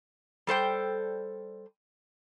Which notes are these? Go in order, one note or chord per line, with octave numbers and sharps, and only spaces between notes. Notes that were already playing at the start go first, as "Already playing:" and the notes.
G3 A4 C5 G5